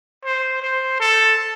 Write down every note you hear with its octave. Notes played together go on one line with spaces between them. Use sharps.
C5
C5
A4